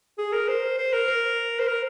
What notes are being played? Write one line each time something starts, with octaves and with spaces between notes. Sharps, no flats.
G#4
A#4
C5
C5
A#4
C5
A#4